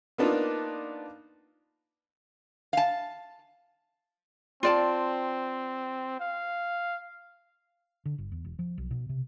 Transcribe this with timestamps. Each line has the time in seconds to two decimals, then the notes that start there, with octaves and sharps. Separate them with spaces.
0.18 A#3 B3 D4 D#4 F4
2.73 F5 A5
4.63 C4 F4 D5 A5
6.20 F5
8.06 D3
8.18 G1
8.32 E2
8.45 E1
8.59 F3
8.78 B1
8.91 B2
9.09 C3